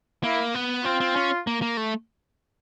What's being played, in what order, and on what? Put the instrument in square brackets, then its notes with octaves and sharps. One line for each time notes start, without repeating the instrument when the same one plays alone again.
[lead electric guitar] A#3 [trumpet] E4
[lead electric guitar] B3
[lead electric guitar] C4 [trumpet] F4
[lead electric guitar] C4
C#4
A#3
A#3
A3